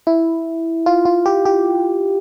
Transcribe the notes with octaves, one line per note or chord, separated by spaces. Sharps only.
E4
F4
F4
G4
G4